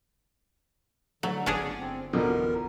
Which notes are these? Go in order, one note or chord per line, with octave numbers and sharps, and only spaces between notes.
D3 F#3 A3
G1 C#4 D4 G#4
C4
E2 B2 D3 F3 A#4